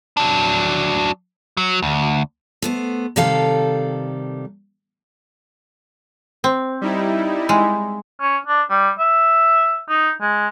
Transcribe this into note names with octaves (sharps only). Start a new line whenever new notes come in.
F#3 D4
F#3
D2
A3 B3 C5
C3 D#3 G3 A4 F5
C4
G3 D#4 E4
G#3
C#4
D4
G3
E5
D#4
G#3